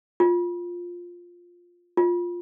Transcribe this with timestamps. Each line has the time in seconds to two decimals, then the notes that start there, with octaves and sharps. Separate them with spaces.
0.20 F4
1.97 F4